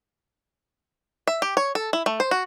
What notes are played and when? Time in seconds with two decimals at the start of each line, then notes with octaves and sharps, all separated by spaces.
1.27 E5
1.42 G4
1.57 C#5
1.75 A4
1.93 E4
2.06 A3
2.20 C5
2.31 F#4